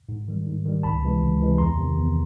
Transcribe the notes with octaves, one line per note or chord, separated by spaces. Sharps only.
G#2
D#3 G3
G#2
D#3 G3
C#2 A5 B5
C3 E3 G#3
C#2
C3 E3 G#3
E2 A#5 C6
C3 D#3
E2